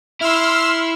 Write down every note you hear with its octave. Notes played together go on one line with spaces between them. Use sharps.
E4 C6 E6 F6